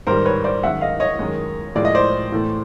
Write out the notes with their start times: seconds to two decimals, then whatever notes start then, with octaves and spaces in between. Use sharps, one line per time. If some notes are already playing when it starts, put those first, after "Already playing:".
0.07 G#2 D#3 G3 A#4 C5
0.25 B4 C#5
0.44 C5 D5
0.63 F#2 D#3 G#3 E5 F#5
0.81 D#5 F5
1.00 C#5 D#5
1.19 F#2 D#3 G#3
1.75 A2 F3 G#3 D5
1.85 D#5
1.95 C5 D5
2.32 A2 E3 A3